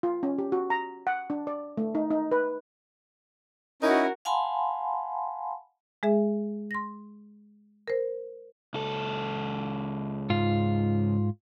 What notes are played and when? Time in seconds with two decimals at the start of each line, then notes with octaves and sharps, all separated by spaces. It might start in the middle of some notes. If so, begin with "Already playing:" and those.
0.03 F4
0.23 C#4
0.38 G4
0.52 F#4
0.70 A#5
1.07 F#5
1.30 D4
1.47 D5
1.77 A3
1.95 D#4
2.11 D#4
2.32 B4
3.82 C#4 D#4 E4 F#4 A#4
4.25 F5 F#5 G#5 A5 B5 C6
6.03 G#3 G#4 E5
6.71 C6 A#6
7.88 A#4 C5
8.74 C#2 A4
10.30 G#2 F4